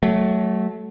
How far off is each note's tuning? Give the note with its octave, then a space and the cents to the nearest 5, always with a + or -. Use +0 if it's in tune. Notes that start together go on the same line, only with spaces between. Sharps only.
F#3 +20 A3 -10